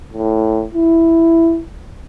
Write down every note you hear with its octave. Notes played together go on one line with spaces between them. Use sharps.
A2
E4